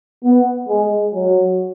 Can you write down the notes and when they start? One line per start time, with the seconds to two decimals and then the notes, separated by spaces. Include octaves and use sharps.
0.25 B3
0.68 G#3
1.14 F#3